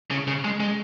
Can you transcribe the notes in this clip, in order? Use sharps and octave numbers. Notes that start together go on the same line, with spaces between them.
C#3
C#3
G#3
G#3